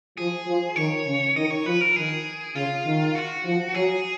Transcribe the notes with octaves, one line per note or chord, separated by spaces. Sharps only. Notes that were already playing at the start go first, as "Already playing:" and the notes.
F3 G#4
F3
D#3 C#5
C#3
D#3 D#5
C#5
F3 B4
A#4
D#3 G#4
C#3 F4
D#3
F#4
F3
F#3 G#4